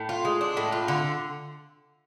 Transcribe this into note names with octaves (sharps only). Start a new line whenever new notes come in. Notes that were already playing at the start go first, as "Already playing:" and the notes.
Already playing: A2
F4
G#3
D4
A2
F4
D3